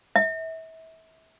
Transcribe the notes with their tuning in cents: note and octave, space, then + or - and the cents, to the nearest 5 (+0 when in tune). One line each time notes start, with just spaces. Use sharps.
E5 -30